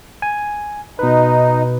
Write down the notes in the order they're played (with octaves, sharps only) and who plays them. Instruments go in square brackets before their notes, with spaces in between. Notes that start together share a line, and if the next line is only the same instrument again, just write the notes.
[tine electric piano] G#5
[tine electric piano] B2 B4 [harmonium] D#4